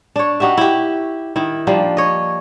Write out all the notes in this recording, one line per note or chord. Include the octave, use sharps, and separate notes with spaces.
D4 C#5
D#4 F#4 G4 E5
E4 G4
D#3 E4
F3 G3 A#3 D4
C#5 D#5